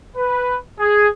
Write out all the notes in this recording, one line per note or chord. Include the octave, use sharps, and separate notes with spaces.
B4
G#4